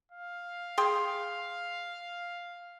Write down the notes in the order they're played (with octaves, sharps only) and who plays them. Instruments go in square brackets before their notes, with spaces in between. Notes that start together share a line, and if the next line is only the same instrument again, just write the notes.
[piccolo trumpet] F5
[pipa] G#4 G5 C6